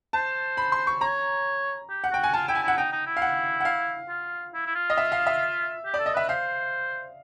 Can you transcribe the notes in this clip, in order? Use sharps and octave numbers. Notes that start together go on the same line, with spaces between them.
C5 A5
B5
C6
C#6
C#5 A#5
G4
F#5
F#4 G5
G#5
F4 A5
E4 G5
G#5
E4
F#5
D#4 G5
D#4
E4
F5
F#5
F#5
F5
F4
E4
E4
F4
D#5
E5
F5
E5
G4
D5
A4
D#5
B4 E5
C5 F5